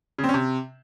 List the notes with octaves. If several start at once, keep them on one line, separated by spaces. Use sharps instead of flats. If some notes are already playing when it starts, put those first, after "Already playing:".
C#3
C4
C#4
C3